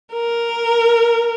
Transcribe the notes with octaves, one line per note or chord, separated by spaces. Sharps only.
A#4